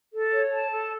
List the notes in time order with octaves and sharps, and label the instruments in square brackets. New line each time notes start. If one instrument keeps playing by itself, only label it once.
[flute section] A4
C#5
A5
A4